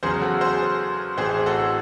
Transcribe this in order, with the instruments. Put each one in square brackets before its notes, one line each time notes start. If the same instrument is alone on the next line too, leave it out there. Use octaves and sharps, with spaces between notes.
[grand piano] E2 C#3 F#3 G#4 C5
F#4 A4
G#4 C5
A1 A2 E3 C4 G#4 C5
F#4 A4